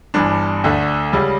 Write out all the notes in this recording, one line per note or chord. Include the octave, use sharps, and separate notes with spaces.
G1 G2 E3 D4
D2 D3 A3
C#2 C#3 G3